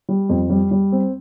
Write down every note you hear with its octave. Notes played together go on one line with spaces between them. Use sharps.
G3
F2
G3
G3
C4